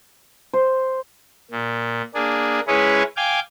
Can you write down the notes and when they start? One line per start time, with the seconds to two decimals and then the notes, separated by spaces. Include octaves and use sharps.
0.54 C5
1.51 A#2
2.15 A#3 D4 G#4
2.67 G#3 C#4 E4 G#4 B4 C#5
3.17 F5 G5 G#5 D6